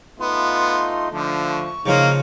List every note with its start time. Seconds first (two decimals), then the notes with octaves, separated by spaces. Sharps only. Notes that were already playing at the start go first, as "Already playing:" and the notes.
0.20 A3 B3 D#4 F4 C6
1.12 D3 F3 A3
1.51 C#6
1.86 C#3 F3 A#3 D#4 F4